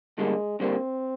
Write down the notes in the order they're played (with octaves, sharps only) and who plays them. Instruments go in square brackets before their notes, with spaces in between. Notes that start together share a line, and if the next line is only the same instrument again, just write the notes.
[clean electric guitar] G2 D3 G3 A#3 [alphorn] G#3
[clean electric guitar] G2 D3 G3 A#3 [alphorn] C4